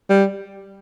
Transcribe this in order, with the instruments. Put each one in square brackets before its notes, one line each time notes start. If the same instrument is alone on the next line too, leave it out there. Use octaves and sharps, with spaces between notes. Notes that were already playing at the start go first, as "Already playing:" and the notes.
[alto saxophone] G3